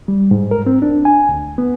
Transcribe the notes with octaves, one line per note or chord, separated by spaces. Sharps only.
G3
G#2
A#4
C4
D4
G#5
D2
B3